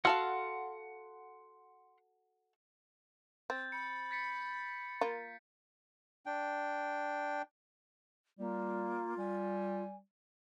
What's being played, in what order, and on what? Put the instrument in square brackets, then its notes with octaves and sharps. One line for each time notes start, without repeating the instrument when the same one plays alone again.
[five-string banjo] F#4 A4 F5 [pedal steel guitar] F#5 C6 F6
[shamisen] C4 [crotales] G6 A6
[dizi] B5 [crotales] C#7
[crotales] A6 B6 C#7
[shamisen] A#3 F4
[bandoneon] D4 G5
[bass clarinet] G3 [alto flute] A#3 [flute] F4
[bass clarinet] G3 [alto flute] G#5